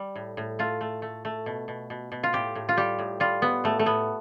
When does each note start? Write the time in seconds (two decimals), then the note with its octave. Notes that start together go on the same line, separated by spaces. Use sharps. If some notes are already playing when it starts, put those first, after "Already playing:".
Already playing: G3
0.15 A2
0.37 A2
0.59 A3 F4
0.81 A3
1.02 A3
1.25 A3
1.46 B2
1.68 B2
1.90 B2
2.12 B2
2.23 F4
2.33 A2 G4
2.55 A2
2.69 F4
2.77 G3 G4
2.99 A2
3.20 G3 F4
3.42 A2 B3
3.64 A2 A3
3.79 A3
3.86 A2 B3